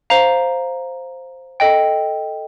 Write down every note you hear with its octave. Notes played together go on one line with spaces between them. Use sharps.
C5 F5 A#5
A4 D#5 G5